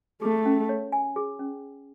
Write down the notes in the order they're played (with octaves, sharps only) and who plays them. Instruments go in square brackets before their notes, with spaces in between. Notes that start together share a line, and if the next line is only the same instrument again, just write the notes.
[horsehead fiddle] A3 [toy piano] G#4
[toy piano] C#4
C#5
G#5
G#4
C#4